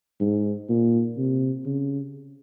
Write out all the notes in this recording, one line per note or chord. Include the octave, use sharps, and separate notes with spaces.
G#2
A#2
C3
C#3